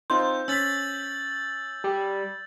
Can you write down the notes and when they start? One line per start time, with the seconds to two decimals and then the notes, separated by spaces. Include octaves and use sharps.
0.10 C4 D#4 F4 C5 C6 G6
0.48 C#4 E6 A6 B6 F#7
1.84 G3